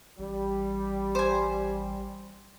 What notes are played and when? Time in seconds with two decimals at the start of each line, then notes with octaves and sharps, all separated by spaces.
0.19 A1 G3
1.15 C5 G#5